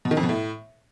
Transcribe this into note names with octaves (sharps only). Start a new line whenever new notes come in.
B2
D#3
F2
B2
A2